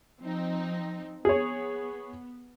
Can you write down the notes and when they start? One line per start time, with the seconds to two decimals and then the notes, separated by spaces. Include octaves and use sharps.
0.21 F3 C4 D#4
1.25 B3 G#4 C#5